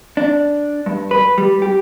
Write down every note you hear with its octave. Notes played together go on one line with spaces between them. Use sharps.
D4
G2
B4
G3
G4